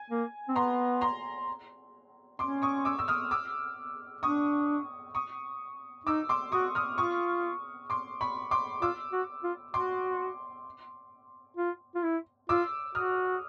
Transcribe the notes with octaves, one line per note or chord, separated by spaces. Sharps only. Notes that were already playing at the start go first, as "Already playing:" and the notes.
Already playing: G#5
A#3
C4
B3 A#5 C6
A#5 C6
C#4 C6 D6
C#6 D#6
D6 E6
E6
D#6 F6
D6 E6
D4 C#6 D#6
C#6 D#6
D#4 D6 E6
C6 D6
F#4 C#6 D#6
D#6 F6
F4 C#6 D#6
C6 D6
B5 C#6
C6 D6
F4 D6 E6
F#4
F4
F#4 C6 D6
F4
F4
E4
F4 D6 E6
F#4 D#6 F6